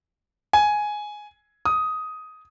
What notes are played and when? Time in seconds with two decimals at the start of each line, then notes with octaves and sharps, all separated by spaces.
0.53 G#5
1.65 D#6